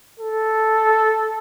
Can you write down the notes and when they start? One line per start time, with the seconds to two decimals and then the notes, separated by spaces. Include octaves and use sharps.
0.20 A4